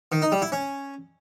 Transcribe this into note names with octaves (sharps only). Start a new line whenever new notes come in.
D#3
D#4
G3
E4
C#4